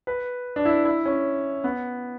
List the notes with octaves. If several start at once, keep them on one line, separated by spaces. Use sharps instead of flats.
B4
D4
E4
E4
C#4
B3